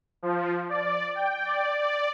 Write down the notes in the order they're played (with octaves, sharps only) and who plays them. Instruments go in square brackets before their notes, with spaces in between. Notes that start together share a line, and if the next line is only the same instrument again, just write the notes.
[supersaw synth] F3
D5
G5
D5
D5